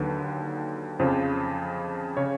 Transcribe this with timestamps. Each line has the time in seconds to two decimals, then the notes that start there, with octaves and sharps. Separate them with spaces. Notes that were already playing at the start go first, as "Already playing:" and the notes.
Already playing: D#2 D3 F#3 B4
0.99 F2 C#3 F3 C5
2.17 C#3 C#5